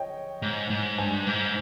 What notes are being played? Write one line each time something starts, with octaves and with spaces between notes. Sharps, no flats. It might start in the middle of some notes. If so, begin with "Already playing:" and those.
Already playing: C#5 D#5 G5
G#2
G#2
G2 G#5
G#2